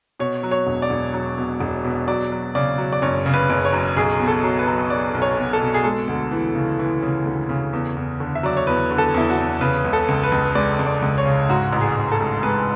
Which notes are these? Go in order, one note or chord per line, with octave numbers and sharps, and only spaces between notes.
B2 C#5
F#3
C#5
E1
D5
E1
F#3
B2
E1
B2
F#3 D5
F#3
C#3 D5
F#3
D5
F#1 C#5
C#3
B4
F#1
C#5
F#2
B1 G#4
B2
A4
F#3
B4
F#3
F#3 D5
B1
C#5
B2
A4
B2
G#4
G#3 A4
D2
E3
C#3
E3
C#3
D2
C#3
E2
E2
D3
E5
F#3 D5
C#5
E2 B4
D3
A4
E2 E4
F#4
E2
C#3 B4
C#2
A4
C#2
B4
C#2
G#3 D5
C#2
D5
C#2
C#5
C#3
G#2 F#4
A1
G#4
A1
A4
A1
G#3 B4